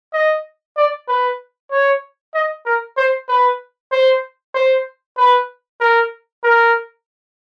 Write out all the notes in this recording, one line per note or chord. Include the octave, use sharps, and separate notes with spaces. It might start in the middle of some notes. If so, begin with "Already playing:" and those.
D#5
D5
B4
C#5
D#5
A#4
C5
B4
C5
C5
B4
A#4
A#4